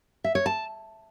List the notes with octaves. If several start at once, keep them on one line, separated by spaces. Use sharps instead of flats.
E5
C#5
A5